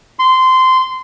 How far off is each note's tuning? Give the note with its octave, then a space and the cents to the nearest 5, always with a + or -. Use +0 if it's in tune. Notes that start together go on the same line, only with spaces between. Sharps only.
C6 -15